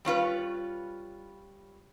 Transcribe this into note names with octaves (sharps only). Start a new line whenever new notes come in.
G3 C#4 F4 B4